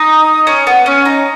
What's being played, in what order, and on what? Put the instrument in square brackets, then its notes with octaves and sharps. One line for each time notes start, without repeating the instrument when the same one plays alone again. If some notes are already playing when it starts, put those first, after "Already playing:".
Already playing: [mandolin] D#4 [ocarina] D#6
[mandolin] C#4
B3
C#4
D#4